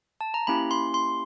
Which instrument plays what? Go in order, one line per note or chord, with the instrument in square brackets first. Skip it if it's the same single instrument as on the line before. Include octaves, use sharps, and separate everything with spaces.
[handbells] A5
A#5
A#3 C#4 E4 G4 B5
C6
C6